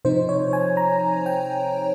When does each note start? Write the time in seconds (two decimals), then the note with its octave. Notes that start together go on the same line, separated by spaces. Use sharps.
0.05 C3 F3 C4 D#4 C5
0.29 C#5
0.53 G#5
0.77 A#5
1.26 G5